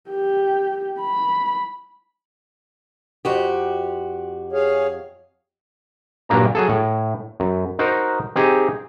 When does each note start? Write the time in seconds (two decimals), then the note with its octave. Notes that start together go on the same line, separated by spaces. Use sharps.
0.10 G4
0.99 B5
3.25 F2 F#4 G4
4.53 G#4 C#5 F5
6.29 G2 A#2 F#3 A#3 D4 A#5
6.55 F#3 G#4 A4
6.69 A2
7.40 F#2
7.79 D#4 F#4 A#4 C5
8.36 C4 D#4 G4 G#4